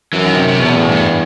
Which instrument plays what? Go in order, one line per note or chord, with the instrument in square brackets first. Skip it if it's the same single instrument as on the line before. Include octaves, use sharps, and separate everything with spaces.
[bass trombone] F#2 [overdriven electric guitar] E3
[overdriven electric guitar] D#3
C3
C3
[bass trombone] E2 [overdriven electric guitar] B2
[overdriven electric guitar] A2
G2